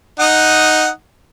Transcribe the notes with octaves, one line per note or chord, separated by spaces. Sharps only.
D#4 F#5 D#6